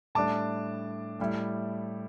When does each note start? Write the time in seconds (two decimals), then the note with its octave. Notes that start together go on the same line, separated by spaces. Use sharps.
0.15 A2 G3 D4 A5 D6
1.20 A2 G3 E4